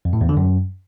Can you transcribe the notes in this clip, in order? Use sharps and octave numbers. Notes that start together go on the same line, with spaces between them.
F2
A2
E2
D3
F#2